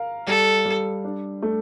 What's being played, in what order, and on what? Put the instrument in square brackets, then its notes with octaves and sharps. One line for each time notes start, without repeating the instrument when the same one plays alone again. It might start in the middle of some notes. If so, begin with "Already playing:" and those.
Already playing: [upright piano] A#4 F5
[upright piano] G3 [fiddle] A4
[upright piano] G3
D4
A3